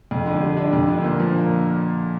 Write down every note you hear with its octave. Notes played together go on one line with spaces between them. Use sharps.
F2
D3
G3
D4
F2
D3
A#2
F3
A#3